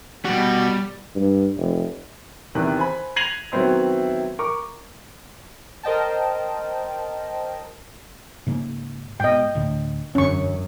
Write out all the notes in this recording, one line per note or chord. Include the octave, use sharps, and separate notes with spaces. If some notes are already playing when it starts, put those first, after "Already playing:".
B2 G3 F#4
G2
F1
E2 C3 D#3 E3 F#6
C5 G#5 B5
G#6 A#6 C7 D#7 F7 F#7
D#3 F#3 B3 C4 E4
A#4 C#6 D6
A#4 C5 D#5 G5 A5
G#2 C#3 A#3
G#2 B2 D#5 G5
D2 A2 D3
E1 F#2 D3 C#4 C#6